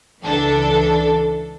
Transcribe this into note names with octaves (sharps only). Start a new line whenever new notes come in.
C#2 E3 D4 A4